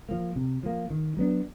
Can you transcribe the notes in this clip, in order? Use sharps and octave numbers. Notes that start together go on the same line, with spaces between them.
F3 A#3
C3
F3 A#3
D#3
F#3 B3 D4